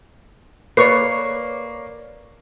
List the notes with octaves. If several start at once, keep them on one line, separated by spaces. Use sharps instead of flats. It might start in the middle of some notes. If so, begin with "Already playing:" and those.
A#3 B4 C#5 D5 C#6 C7